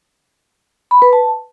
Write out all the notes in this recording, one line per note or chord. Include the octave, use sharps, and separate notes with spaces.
B5
B4
A5